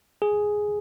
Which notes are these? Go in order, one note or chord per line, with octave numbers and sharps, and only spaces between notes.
G#4